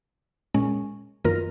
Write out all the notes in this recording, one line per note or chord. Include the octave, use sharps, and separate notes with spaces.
A#2 G#3 C#4
F#2 D#3 A#3 F4 A#4